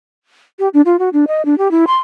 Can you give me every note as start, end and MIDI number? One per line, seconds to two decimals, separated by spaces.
0.59 0.68 67
0.74 0.81 62
0.85 0.96 65
0.99 1.09 66
1.13 1.25 62
1.28 1.44 75
1.45 1.57 62
1.58 1.71 67
1.71 1.85 64
1.87 1.97 84